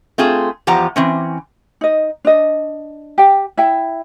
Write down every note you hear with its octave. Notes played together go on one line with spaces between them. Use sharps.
A3 C4 F4 G#4
E2 F3 G4 F#5 A#5
E3 C4 C#4
D#4 D#5
D4 D#5
G4 G5
E4 E5 G5